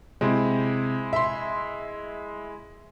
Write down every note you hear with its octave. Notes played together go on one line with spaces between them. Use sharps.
C3 G#3 C4 E4
E5 C6